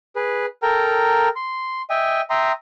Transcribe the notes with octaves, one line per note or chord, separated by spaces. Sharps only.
G#4 B4
A4 A#4 G5 A#5
C6
D#5 E5 G5 G#5
E5 G5 A#5 C6 D#6